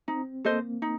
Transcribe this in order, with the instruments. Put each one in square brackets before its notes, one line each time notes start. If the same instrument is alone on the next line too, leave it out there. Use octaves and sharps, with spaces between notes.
[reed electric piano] C4 [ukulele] D#4
[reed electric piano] A#3 [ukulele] A4 C5 D#5
[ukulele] D#4